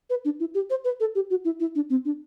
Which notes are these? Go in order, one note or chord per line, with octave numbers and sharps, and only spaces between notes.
B4
D4
E4
G4
C5
B4
A4
G4
F#4
E4
E4
D4
C4
D4